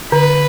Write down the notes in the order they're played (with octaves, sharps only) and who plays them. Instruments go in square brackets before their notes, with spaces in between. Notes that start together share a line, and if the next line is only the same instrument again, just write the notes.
[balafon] D3 [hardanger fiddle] B4